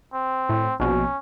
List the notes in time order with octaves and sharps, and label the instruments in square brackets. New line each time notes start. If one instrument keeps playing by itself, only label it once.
[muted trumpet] C4
[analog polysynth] A2
[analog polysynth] A#1 B2 [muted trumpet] C#4